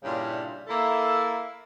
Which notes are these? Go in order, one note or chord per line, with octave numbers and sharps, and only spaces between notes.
G2 A#2 C#3 E4
A#3 E4 A4 E5